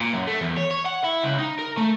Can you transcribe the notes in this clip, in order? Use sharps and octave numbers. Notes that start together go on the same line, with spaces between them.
A#2
F#2
A3
E2
C#5
C#5
F#5
E4
C#2
D#4
A#4
A3